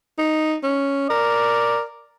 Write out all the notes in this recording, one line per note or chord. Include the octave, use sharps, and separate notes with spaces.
D#4
C#4
A#4 D5